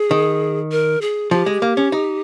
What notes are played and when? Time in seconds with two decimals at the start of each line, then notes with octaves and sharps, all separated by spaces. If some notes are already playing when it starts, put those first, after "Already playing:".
Already playing: G#4
0.11 D#3
0.72 A#4
1.02 G#4
1.31 F3 G4
1.46 G#3
1.62 A#3
1.77 C#4
1.92 D#4